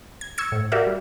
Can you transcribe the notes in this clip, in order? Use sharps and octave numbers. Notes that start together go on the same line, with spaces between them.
G#6
C#6 E6 G#6 C#7
A2
F#4 G4 A#4 D5 E5 F5
G3